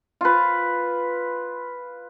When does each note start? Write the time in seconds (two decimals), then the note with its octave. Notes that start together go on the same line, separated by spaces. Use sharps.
0.21 F4 B4